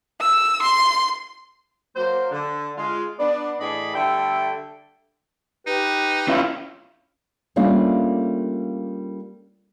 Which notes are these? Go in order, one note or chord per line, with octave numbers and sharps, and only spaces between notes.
E6
C6
F#3 A#3 C5
D3
G#3 F4
B3 D4 D5
A2 E3 G#4 D5 D#5 B5
D3 G3 A3 A4 E5 G5
D#4 G4 B4
C#4 E4 F4
G3 A3 A#3 C#4 D4 F4